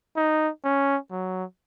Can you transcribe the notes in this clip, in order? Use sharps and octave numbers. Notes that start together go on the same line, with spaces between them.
D#4
C#4
F#3